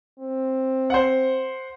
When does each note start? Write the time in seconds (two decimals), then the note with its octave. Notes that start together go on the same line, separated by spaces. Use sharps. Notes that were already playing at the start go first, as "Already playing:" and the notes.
0.19 C4
0.90 C5 F#5